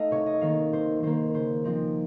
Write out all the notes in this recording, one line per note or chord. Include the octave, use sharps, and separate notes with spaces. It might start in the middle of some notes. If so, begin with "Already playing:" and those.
Already playing: A3 D#4 D#5 F5 A5
C3 C#5
D#5
D#3 A#3 F5
C3 C5
D#3 A#3 C5
C#3 C5
F3 C4 D#4